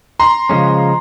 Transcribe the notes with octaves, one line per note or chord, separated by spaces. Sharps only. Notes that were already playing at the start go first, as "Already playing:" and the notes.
A#5 C6
C#3 F3 G#3 C#4